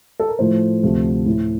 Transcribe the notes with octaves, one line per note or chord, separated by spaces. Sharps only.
A4
A#4
A2 F3 A3 C5
D2 C3 F3 A3
A2 A3